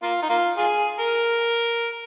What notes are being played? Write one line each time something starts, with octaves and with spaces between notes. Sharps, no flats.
A#3 F4
D#4
A#3 F4
F4 G#4
A#4